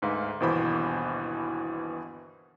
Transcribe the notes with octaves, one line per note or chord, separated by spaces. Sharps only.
D2 G#2 B4 F5
G1 D#2 B2 E3 C5 B5